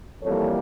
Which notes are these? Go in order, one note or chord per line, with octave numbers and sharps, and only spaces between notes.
F2 E3 G3 A#3 A4 C#5